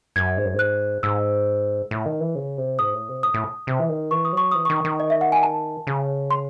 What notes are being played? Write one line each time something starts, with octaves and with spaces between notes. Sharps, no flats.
F#2 G#6
G#2
F#2
G#2
F#6
G#2 E6
A2
D#3
E3
C#3
C3
G#2 D#6
A2
C3
A2 D#6
A2
C3
E3
D#3
E3 C#6
D#6
F#3 C#6
E3 D#6
D#3 C#6
D#3
D#5
E5
F#5
G#5
A5
C#3
C6